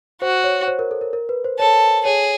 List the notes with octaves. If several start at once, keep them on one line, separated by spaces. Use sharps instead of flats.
F#4 C5
C#5
C5
A#4
A4
A#4
A#4
B4
C5
A4 C#5
G#4 C#5